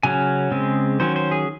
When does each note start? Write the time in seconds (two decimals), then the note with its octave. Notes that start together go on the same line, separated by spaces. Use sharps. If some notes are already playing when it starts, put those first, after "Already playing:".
0.03 C#3 F#3 C#4 G#5
0.52 C#3 G#3 C4
1.00 D#3 F#3 C#4 C5
1.16 C5
1.31 G#4